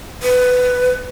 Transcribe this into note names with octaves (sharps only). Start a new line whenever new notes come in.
B4